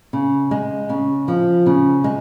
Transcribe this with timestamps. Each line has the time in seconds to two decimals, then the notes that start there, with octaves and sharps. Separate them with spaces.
0.13 C#3
0.51 G#3
0.89 C#3
1.28 F3
1.66 C#3
2.04 G#3